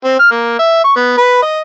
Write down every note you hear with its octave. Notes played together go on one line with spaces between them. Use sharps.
C4
F6
A#3
E5
C#6
B3
B4
D#5